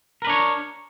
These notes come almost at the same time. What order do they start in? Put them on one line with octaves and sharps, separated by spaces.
A#4 B4 D4 C#5